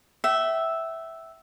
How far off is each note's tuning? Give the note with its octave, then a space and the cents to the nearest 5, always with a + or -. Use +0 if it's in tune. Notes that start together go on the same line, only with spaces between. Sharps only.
E5 -5 G5 -40